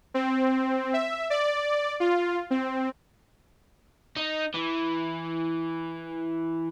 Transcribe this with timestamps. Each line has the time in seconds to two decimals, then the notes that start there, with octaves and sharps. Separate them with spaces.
0.14 C4
0.93 E5
1.30 D5
2.00 F4
2.51 C4
4.16 D#4
4.54 E3